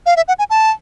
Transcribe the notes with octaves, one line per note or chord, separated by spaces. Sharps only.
F5
E5
F#5
G#5
A5